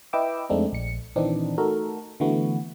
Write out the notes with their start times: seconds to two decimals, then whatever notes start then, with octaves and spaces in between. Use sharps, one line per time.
0.13 E4 B4 D#5 G5 D6 E6
0.49 F2 G#3 A3 C4 D4 D#4
0.73 A#1 C#7
1.16 A#2 D#3 E3 C4 D4 D#4
1.58 A3 D#4 F#4 A4 A#4
2.20 D3 E3 A3 B3 F#4